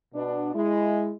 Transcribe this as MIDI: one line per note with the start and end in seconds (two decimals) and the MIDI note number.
0.14 0.51 47
0.14 0.51 62
0.54 1.12 56
0.54 1.12 64